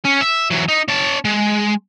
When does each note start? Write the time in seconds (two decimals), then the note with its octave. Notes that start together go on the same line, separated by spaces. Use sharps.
0.05 C#4
0.21 E5
0.50 E3 F#3
0.68 D#4
0.88 C#4 A5
1.25 G#3